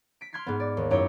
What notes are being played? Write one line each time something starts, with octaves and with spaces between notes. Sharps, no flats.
B6 D7
C6 F6 G#6 B6 C7
G#2 B3
D5
D#2
F#2 D#4 E4 G4 C#5 G6